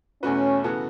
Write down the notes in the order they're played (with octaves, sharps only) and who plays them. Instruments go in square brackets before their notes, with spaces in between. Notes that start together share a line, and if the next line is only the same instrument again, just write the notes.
[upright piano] E2 B2 A3 F#4 B4 [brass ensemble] C#4
[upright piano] C#3 E3 B3 F#4 A4